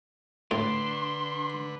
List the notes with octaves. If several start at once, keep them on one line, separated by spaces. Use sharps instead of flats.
A2 D3 D4 B4 C6